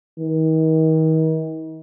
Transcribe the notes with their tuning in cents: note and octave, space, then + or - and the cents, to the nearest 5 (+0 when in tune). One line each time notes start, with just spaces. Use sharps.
D#3 +40